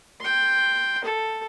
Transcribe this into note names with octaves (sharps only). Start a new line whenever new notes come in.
G5 C6
A4